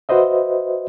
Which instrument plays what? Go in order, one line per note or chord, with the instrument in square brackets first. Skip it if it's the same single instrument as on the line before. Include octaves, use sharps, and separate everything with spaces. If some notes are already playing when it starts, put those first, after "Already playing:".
[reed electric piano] F#4 B4 C5 D#5 E5